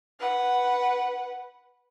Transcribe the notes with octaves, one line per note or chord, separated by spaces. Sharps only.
B4 F#5